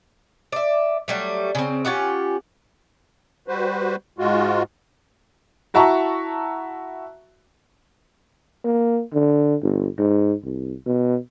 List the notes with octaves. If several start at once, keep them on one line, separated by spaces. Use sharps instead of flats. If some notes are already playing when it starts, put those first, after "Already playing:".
D5 E5
F#3 G3 A3
C#3 C4
C#4 F4 G4 F#5
G3 F#4 B4 C5
G#2 G#3 F4 F#4
E4 F#4 E5 A5 A#5 C#6
A#3
D3
G1
G#2
C2
B2